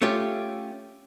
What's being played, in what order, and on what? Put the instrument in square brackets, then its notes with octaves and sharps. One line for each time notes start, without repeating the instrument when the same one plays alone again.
[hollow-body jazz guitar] A3 C#4 F4 G4